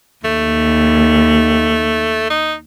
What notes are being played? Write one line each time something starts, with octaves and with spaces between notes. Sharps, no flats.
D#2 A3
D#4